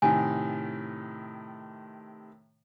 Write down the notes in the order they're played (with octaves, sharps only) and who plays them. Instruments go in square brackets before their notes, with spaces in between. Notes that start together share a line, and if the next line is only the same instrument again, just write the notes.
[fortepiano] A2 C3 D#3 [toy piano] G#5